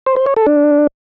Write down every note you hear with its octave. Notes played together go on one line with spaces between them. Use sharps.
C5
C5
C#5
A4
D4